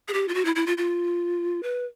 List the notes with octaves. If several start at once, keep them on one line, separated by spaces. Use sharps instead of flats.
G#4
G4
F4
F#4
E4
E4
F4
F4
B4